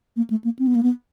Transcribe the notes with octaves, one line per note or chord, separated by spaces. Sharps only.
A#3
A3
A#3
C4
B3
A#3
B3